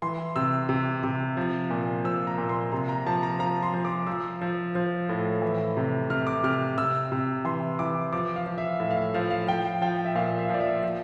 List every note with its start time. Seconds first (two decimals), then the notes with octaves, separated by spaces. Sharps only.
0.02 E3 C6
0.36 C3 E6
0.69 C3
1.04 C3
1.37 F3
1.70 A#2
2.04 F3 E6
2.27 A#5
2.38 A#2
2.49 C6
2.72 C3 A#5
2.89 A#5
3.07 F3 A5
3.23 A#5
3.39 F3 A#5
3.63 C6
3.74 F3
3.85 D6
4.07 F3 E6
4.41 F3
4.75 F3
5.09 A2
5.42 E3
5.77 C3
6.10 C3 F6
6.27 D6
6.44 C3 F6
6.78 C3 E6
7.12 C3
7.45 E3 C6
7.79 E3 D6
8.12 F3 D6
8.36 F5
8.46 F3
8.58 E5
8.80 A2 E5
8.91 F5
8.97 E5
9.14 F3 F5
9.30 F5
9.48 F3 G5
9.82 F3 G5
10.05 E5
10.15 A#2 F5
10.38 E5
10.49 F3 D5
10.60 E5
10.83 F3